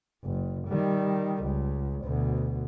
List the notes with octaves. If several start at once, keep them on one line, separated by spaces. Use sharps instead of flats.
F#1
D#3 G3
C#2
D2 B2